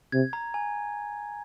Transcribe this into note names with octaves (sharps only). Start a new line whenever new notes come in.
C3 G#6
A#5
G#5